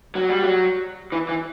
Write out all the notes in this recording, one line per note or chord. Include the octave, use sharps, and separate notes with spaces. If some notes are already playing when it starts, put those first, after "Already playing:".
F#3
G3
F#3
E3
E3